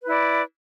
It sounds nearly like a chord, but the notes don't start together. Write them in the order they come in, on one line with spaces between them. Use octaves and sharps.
B4 E4 D5